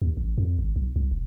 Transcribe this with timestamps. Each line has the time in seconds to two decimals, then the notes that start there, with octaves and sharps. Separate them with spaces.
0.02 D#2
0.17 A1
0.38 F2
0.59 G#1
0.76 B1
0.96 C2
1.11 E1